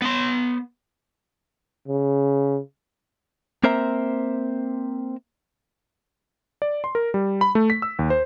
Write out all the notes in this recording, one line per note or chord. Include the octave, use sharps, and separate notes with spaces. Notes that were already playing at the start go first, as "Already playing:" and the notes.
B3 C6
C#3
A#3 C4 A#4 C5 E5 A#5
D5
C6
A#4
G3
B5
A3
B6
E6
D#2
C5